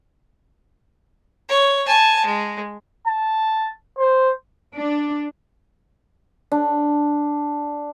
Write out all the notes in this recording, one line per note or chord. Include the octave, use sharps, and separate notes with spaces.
C#5
G#5 A5
G#3
A5
C5
D4
D4